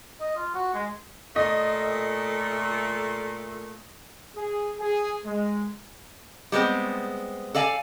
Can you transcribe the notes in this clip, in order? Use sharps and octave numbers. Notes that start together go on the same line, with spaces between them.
D#5
F4
F#4
G#3
A#2 A3 D#5
G#4
G#4
G#3
G3 G#3 B3 C4
A4 D5 F5 G#5